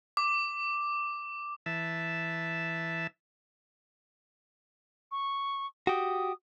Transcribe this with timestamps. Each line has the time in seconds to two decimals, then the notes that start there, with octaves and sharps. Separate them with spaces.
0.17 D6
1.66 E3 E5 A5
5.12 C#6
5.87 F#4 G4 D#6